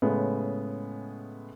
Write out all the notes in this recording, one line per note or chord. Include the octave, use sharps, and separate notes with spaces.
A2 C#3 G#3 B3